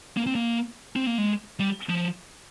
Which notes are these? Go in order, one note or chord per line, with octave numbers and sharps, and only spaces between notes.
A#3
C4
A#3
C4
A#3
G#3
G3
F3